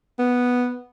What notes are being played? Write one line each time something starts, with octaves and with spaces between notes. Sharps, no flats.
B3